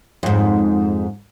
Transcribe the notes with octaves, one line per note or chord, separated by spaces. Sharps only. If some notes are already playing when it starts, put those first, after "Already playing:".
F2 G#2